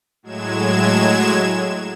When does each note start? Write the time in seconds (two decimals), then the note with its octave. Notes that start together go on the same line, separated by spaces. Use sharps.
0.23 A2 F#3 G#3 G#6 E7